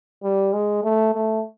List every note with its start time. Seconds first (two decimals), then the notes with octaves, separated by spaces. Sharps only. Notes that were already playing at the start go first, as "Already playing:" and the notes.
0.23 G3
0.53 G#3
0.84 A3
1.14 A3